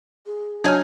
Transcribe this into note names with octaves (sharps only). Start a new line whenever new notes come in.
G#4
F#3 D4 D#4 C#5 G#5 F6